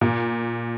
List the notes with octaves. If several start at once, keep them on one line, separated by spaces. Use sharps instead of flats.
A#2